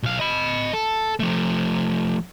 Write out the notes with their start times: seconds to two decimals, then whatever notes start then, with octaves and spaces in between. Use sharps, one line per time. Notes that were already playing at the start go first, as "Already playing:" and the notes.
0.03 B1 F5
0.20 D#5 B5
0.73 A4
1.20 F3 A3